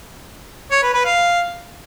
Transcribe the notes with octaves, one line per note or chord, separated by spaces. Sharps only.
C#5
B4
B4
F5